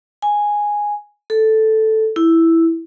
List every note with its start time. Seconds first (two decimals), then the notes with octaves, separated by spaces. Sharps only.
0.22 G#5
1.30 A4
2.16 E4